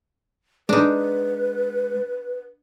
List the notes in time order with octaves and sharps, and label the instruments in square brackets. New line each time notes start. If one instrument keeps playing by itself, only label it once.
[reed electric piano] G#3 [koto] D4 D#4 [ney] B4